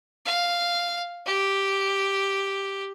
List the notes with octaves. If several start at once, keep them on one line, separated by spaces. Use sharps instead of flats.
F5
G4